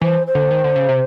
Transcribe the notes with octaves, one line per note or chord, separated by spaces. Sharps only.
E3 C5
C5
D3
D#3
D3
C#3
C3